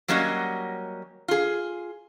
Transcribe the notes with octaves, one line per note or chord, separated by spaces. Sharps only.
F#3 G3 A#3 C#4 F#4 D#5
F4 G#4